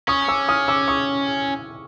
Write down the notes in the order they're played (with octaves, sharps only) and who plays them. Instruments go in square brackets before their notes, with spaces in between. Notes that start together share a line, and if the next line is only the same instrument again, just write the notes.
[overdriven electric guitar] C#4 [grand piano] C#6 D#6
[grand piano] D6 E6
D#6 F6
D6 E6
C#6 D#6